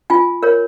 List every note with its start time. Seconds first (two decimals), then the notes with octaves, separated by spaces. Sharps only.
0.10 F4 G#5
0.43 A#4 C#5